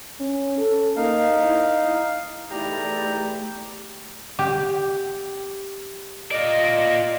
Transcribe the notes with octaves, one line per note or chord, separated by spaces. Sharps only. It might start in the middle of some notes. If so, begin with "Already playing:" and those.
C#4
A4
A#3 D#4 F5
E4
E2 A3 D#4 E4 G4 D5 A#5
G4
F4 D5 D#5